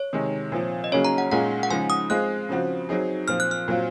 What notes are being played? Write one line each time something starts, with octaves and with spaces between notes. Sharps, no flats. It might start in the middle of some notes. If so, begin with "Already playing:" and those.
Already playing: C#5
C3 D#3 G#3
A#2 F3 C4
D#5
C#3 F#3 A#3 C#4 G#4 C#5
A#5
F#5
A#2 G#3 C#4 F4 G#4 F#5
F#5
C#3 F3 G#3 D#4 G#5
D#6
G#3 C4 F4 G#4 F#6
C#3 F3 C4 F#4
F#3 C4 D#4 G#4
A#2 F3 C4 F6
F#6
F6
A#2 F#3 C4 F4